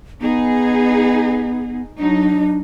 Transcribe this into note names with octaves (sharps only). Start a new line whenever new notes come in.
B3 D#4 G#4
F#3 D4 D#4